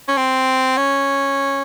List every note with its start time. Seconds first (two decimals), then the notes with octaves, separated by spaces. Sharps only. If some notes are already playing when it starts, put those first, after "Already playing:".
0.08 C#4
0.17 C4
0.78 C#4